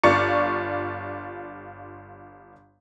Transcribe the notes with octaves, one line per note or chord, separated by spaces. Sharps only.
G1 F4 D5 C#6 C#7